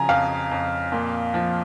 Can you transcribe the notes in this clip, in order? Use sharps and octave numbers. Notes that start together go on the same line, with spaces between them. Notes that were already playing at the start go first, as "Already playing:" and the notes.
Already playing: C#3 F3 G#5 A#5
F2 F5
F2
A#2
F3